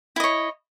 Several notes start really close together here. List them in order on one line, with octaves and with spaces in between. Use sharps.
E4 D#5 C#5